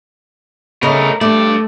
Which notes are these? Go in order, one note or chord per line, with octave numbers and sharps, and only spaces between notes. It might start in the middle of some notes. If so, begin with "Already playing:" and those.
C#3 A3 A#4 D#5
G2 A3 D5